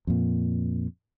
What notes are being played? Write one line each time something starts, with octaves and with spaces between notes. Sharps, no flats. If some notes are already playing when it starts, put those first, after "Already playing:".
F2 A#2